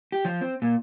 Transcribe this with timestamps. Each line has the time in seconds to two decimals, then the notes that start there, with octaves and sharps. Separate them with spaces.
0.12 G4
0.25 F3
0.41 C4
0.62 A#2